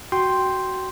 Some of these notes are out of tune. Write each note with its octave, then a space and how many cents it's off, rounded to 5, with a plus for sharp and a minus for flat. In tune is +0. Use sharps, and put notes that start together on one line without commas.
F#4 +15 G5 +0 C6 +0